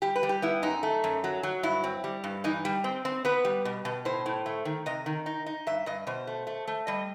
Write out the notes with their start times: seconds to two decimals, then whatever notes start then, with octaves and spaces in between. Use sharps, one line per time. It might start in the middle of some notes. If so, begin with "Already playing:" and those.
0.02 G3 G4
0.16 B4
0.23 G3
0.29 G4
0.42 B3 E4
0.63 F#2 D#4
0.83 A3
1.04 F#2
1.24 F#3
1.43 F#3
1.63 G2 E4
1.84 C4
2.04 G3
2.24 G2
2.44 E3 D#4
2.65 G3
2.84 C4
3.05 C4
3.25 B3 B4
3.45 G3
3.65 B2
3.85 B2
4.05 A2 C5
4.26 A2
4.46 A3
4.65 D#3
4.86 C3 D#5
5.06 D#3
5.26 D#4
5.46 D#4
5.67 G2 E5
5.86 G2 D#5
6.07 B2 C5
6.27 A3
6.47 A3
6.68 A3
6.87 G3 D#5